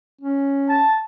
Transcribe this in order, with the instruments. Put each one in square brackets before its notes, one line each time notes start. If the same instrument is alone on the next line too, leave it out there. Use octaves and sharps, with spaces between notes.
[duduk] C#4
[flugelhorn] A5